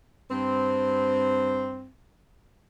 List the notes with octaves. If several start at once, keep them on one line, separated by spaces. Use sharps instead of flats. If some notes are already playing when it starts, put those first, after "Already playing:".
G2 C4